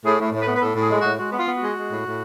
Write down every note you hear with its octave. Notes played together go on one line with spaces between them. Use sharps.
A2 G#4
A2
A2
B4
B3
B4
A2 A4
A2
G#4
G#3
F#4
A2
G#3 F#4
B3 F4
B3
G#3 F#4
G#3
A2
A2